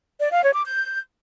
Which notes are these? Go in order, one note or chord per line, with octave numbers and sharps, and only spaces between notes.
D5
F5
C#5
D6
G6